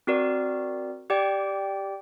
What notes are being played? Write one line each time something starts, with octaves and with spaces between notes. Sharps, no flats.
C4 F#4 A#4 D5
G4 D5 G5